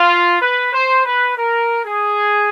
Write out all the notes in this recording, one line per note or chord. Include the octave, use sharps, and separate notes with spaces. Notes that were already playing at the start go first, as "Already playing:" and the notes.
Already playing: F4
B4
C5
B4
A#4
G#4